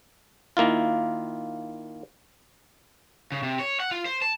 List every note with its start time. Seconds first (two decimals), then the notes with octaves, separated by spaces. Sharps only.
0.57 D#3 A#3 E4 F4
3.32 C#3
3.43 C3
3.59 C#5
3.80 F#5
3.91 F4
4.05 C5
4.22 A5